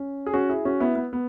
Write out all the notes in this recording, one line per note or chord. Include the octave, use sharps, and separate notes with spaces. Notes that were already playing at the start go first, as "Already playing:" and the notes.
Already playing: C#4
G#4
C#4 F#4
E4 G#4
C#4 F#4
B3 E4
B3
B3